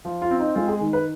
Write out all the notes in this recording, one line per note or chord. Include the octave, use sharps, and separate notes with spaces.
F3
F4
C4
D#4
G#3 F4
G#4
D#3
B4